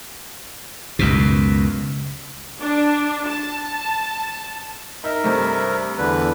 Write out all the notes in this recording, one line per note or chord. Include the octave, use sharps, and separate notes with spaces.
C#2 F#2 B2
D4
A5
D#4 A#4 E5
G2 C3 A3
E2 D3 B4